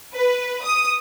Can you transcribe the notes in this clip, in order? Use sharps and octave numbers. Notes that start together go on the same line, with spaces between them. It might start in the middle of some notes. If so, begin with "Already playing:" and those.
B4
D#6